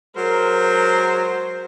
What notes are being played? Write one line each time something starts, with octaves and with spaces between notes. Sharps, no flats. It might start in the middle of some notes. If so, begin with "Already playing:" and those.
F#3 G#3 A#4 C5